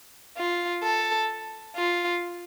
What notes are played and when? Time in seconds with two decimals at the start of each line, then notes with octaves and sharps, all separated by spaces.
0.37 F4
0.83 A4
1.76 F4